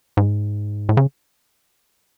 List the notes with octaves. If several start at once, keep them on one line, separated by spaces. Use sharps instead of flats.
G#2
A2
C#3